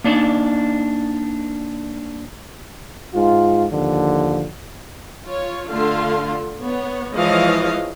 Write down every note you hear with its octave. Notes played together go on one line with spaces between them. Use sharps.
A#3 D4 D#4 D5
G#2 F4
D#2 D3 F3
F4 C#5
D3 A3 F4 F5 C6
B3 C#5
E3 F3 G#3 C#5 D#5 F5